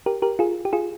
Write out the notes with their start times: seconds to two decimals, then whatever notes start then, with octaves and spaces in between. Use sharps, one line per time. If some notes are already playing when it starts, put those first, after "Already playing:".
0.06 G4 A#4
0.22 G4 A#4
0.39 F4 G#4
0.65 G4
0.73 F4 G#4